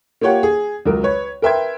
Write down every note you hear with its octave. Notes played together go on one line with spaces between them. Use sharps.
A#3 F4 G4 C#5 F#5
G#4
C#2 F#3 A#4
B4 C#5
A#4 B4 E5 G5 C6 G#6